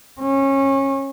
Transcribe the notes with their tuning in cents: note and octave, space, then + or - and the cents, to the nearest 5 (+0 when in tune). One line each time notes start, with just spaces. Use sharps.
C#4 -25